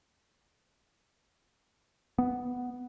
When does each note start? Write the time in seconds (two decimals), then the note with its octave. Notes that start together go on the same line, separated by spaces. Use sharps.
2.18 B3